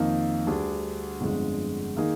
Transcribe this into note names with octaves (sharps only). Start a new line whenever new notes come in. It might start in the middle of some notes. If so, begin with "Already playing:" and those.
Already playing: F2 D#3 A#3 D#4
D2 D3 G3 D4 G#4
G1 F2 D3 G#3
D#3 A#3 D#4 G#4